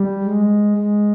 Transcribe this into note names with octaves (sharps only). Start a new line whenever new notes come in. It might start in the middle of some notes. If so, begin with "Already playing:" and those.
Already playing: G3
G#3
G#3